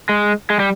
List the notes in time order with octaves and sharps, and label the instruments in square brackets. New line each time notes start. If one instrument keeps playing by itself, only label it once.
[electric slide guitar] G#3
G#3
G3